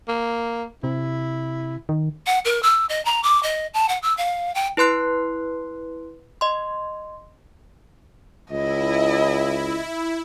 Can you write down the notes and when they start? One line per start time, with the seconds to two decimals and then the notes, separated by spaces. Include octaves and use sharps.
0.08 A#3
0.84 C3 E4
1.89 D#3
2.26 F#5
2.45 A#4
2.63 E6
2.89 D#5
3.05 A#5
3.23 D6
3.43 D#5
3.74 A5
3.89 F#5
4.02 E6
4.17 F5
4.55 G5
4.77 E4 B4 C6 F#6 C7
6.41 D#5 C6
8.51 C#2 E4 D#5